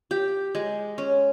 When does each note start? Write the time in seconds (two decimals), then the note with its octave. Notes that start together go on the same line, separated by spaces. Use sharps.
0.11 G4
0.55 G#3
0.98 C#4